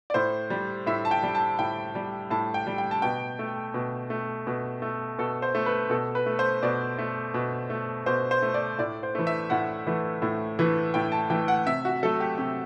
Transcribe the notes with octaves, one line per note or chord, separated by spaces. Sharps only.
D5
A2 C5
G3
A2 E5
A5
G5
G3
A5
A2 G5
G3
A2 A5
G5
G3
G5
A5
B2 G5
A3
B2
A3
B2
A3
B2 A4
C5
A3
B4
B2 A4
B4
A3
C5
B2 D5
A3
B2
A3
B2 C5
C5
A3
D5
A2 D5
C5
E3 A3
E5
A2 F#5
E3 A3
A2
E3 A3
A2 G5
A5
E3 A3 G5
F#5
C3 E5
F#4
F#3 A3 A4
G4
C3 G4